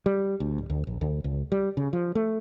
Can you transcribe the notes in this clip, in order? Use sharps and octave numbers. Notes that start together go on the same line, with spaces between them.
G3
D2
D1
D2
A#1
D2
C#2
G3
C#3
F3
A3